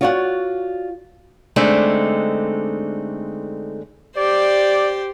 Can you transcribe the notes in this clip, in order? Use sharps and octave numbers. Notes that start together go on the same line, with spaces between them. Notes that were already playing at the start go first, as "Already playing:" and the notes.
F4 F#4 C#5 D5 F5 F#5
D3 G#3 A3 C4 D4 D#4
G4 C5 D5